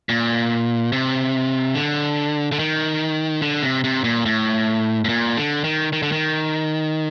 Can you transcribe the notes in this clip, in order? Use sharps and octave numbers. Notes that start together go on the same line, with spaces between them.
A#2
C3
D3
D3
D#3
D3
C3
C3
A#2
A2
A2
A#2
D3
D#3
D#3
D3
D#3